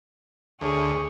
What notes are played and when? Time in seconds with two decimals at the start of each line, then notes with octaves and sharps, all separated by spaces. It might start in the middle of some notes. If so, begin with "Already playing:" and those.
0.61 D2 G#4 C#5